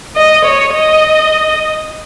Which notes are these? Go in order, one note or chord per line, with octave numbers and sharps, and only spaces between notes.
D#5
C#5
D#5